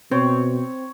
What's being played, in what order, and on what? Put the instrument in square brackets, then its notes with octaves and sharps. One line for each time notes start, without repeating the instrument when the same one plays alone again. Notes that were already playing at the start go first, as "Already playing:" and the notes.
[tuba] B2 [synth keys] C4 [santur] C#5